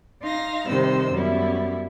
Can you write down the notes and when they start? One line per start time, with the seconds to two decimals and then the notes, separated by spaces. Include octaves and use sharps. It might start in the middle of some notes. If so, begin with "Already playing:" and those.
0.22 D#4 F5 C6 A#6
0.66 C3 D#3 G3 D#4 C5 E6
1.11 F#2 G3 B3 E4